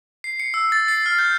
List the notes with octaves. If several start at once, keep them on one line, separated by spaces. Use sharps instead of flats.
C7
C#7
E6
A6
C7
F6
G6